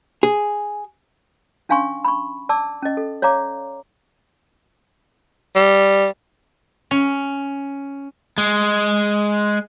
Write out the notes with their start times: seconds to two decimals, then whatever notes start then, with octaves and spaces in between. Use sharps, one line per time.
0.23 G#4
1.69 C#4 D4 F5 G#5 C6 C#6
2.05 B5 C#6
2.49 D5 A5 D6 E6
2.82 C#4 D#5
2.97 A4
3.22 C#5 D5 F5 A#5 D6
5.56 G3
6.91 C#4
8.38 G#3